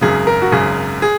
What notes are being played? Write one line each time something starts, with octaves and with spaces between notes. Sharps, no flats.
G#1 F#2 C#3 G#4
A#4
F#4
G#1 F#2 C#3 G#4
G#4